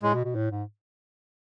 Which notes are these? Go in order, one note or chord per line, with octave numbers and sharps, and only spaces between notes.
A2 G#3
B2
B2
A2
G#2